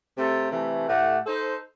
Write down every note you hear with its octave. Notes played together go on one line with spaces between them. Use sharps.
C3 A3 A4 C5
C3 E3 A3
A2 A3 G4 F#5
D#4 A4 C5